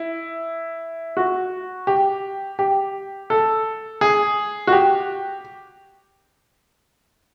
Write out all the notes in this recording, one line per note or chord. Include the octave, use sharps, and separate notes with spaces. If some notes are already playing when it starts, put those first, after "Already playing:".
Already playing: E4
F#4
G4
G4
A4
G#4
F#4
G4